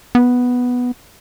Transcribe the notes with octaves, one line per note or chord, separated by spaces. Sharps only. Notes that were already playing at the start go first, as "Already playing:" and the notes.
B3